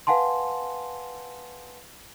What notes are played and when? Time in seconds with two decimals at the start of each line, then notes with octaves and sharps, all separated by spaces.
0.07 B4 F5 F#5 G#5 A5 C6